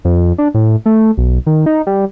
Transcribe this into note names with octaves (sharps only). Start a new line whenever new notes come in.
F2
D4
A2
A3
B1
D#3
D#4
G3